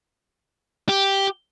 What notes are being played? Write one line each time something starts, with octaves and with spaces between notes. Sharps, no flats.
G4